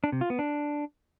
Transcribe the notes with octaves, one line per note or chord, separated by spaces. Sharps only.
D4
C3
F4
B3
D4